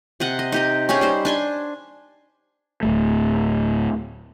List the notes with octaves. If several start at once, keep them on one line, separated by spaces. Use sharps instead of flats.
C3 D#5 F#5
D#5
D#4 G4 D#5
C#4 D#4 G4 G#4
G3 D#4 C5
D4 G#5 C6
D1 G1 A3